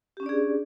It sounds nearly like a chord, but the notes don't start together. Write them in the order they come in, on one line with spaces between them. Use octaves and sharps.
G4 C#4 D4 D5 G#4